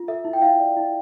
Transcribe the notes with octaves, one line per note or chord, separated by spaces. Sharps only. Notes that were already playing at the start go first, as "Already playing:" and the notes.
Already playing: F4
A4 E5
E4
G5
E4 F5
D5
E4